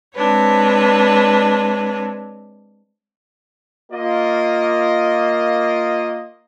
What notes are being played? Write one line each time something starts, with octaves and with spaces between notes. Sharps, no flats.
G#3 C4 D4 B4 C#5
A#3 F4 D#5